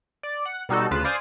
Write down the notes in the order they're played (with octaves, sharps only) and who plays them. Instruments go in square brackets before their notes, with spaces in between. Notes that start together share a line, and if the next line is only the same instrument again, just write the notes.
[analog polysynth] D5
F#5
B2 G3 D#4 F#4 A4
D2 C#3 F4 B4 A5
C5 D5 F5 G#5 D#6